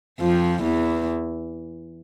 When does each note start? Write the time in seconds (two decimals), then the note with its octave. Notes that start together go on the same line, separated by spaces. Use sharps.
0.21 F2 F3
0.62 E2 E3